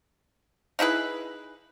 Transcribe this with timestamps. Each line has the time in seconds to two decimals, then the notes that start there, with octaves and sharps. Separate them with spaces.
0.79 D#4 E4 G#4 B4